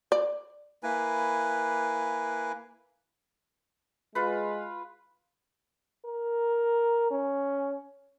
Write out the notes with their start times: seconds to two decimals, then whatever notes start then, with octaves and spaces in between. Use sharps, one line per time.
0.12 D5
0.83 A#3 E4 B4 G#5
4.15 G#3 F4 B4
6.05 A#4
7.11 C#4